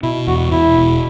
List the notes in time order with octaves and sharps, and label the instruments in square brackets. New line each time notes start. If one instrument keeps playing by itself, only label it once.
[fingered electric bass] B2 [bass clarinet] E4
[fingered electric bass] E2 [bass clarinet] F#4
[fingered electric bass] B2 [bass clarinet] E4
[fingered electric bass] E1